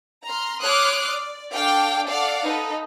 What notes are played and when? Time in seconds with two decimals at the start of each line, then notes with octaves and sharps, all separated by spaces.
0.25 A#5 C6 F6
0.63 C#5 C6 D6 D#6 F6 F#6
1.09 D5
1.52 D4 A4 F5 G5 D6
2.08 A4 D5 F5 F#5
2.44 D#4 A4 B4